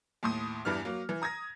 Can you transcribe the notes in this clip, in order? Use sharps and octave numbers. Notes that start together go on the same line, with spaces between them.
D#2 A2 C6 D#6
E2 G2 E3 D4 F6
F#3 A#3
E3
A#5 D#6 G#6 A#6